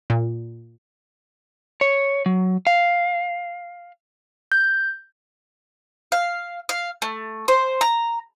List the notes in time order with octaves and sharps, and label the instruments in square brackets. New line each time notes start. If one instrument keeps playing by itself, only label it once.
[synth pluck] A#2
[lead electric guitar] C#5
F#3
F5
[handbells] G6
[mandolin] F5
F5
A3
C5
A#5